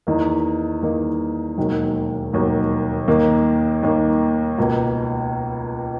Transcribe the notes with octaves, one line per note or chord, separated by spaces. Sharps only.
E2 D#3 A#3 D#4
E2 D#3 A#3 D#4
E1 D#2 D#3 F#3
E1 D#2 D#3 F#3
D#2 D#3 A#3
D#2 D#3 A#3
C#2 B2 A#3